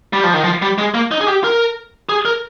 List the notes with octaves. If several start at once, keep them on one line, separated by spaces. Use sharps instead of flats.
G3
F3
D#3
F3
G3
G#3
A#3
D#4
G#4
G4
A#4
G#4
A#4